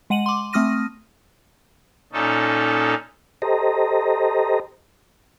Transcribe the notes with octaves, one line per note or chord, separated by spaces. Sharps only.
G#3 F#5 D#7 F#7
C6 D6
A3 C4 D#6 F6 A#6 D#7
A#2 C#4 D#4 A4
G4 A4 C5 D#5 A#5